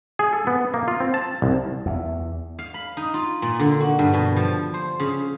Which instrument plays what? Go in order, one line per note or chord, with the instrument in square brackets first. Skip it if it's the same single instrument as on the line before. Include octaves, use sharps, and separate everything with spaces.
[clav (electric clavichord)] G#4
A4
B3
A#3
F4
C4
A5
C2
[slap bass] E2
[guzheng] F5
B5
D#4
F4
A#2
D3
F#4
G2
B2
F3
C5
C#3